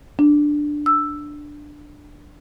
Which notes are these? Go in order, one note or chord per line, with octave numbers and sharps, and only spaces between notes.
D4
E6